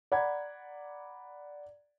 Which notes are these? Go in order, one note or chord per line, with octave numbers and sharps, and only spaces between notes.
D5 F#5 A#5 B5 G#6